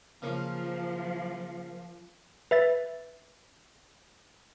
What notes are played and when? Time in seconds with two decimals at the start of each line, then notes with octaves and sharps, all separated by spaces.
0.22 C#3 F3 A#3
2.51 B4 E5 A6